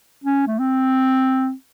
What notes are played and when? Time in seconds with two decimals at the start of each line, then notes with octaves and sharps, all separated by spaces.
0.24 C#4
0.47 A3
0.59 C4